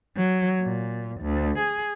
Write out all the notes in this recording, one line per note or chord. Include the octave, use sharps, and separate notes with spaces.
F#3
A#2
D2
G#4